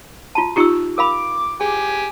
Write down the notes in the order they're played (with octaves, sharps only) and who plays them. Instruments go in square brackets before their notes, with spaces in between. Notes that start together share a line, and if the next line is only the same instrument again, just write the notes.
[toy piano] F4 F#4 A5
[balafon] D#4 F4 A#5 [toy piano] G4 C#6 E6
[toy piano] A#4 F5 B5 [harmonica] D6
[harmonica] G4 G#5 [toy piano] G#4